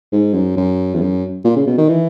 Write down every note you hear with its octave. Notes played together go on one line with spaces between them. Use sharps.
G#2
F#2
F#2
E2
F#2
A#2
C#3
B2
D#3
E3